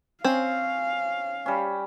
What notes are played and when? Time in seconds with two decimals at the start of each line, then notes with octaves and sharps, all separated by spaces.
0.25 C4 C#4 F5
1.46 G3 C#4